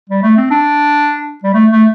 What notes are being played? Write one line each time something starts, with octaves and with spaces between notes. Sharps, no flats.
G3
A3
C4
D4
G3
A3
A3